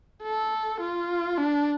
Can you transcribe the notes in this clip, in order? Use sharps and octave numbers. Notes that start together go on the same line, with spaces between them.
A4
F4
D4